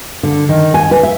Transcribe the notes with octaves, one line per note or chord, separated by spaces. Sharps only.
D3
D#3
G#5
B4
E5